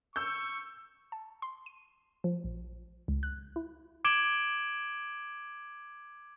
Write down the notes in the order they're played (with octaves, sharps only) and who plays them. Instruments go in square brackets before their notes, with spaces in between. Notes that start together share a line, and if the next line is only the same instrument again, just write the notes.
[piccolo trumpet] C#6 [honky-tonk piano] E6 G6
[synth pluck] A5
C6
D#7
F3
A#1
C#2
F#6
E4
[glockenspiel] D6 G#6 D7 E7 F#7 G7